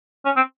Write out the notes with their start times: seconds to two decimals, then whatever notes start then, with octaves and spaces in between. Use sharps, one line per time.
0.26 C#4
0.36 C4